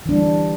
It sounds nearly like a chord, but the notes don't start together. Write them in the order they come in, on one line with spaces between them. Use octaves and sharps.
E3 D4 G3